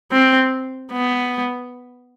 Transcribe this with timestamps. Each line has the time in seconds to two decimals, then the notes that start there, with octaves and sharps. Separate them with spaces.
0.12 C4
0.92 B3